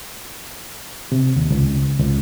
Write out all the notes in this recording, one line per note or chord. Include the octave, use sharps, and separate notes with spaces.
C3
D#2
C#2
C#2